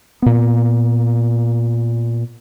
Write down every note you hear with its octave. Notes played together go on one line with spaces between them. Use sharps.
A#2 B3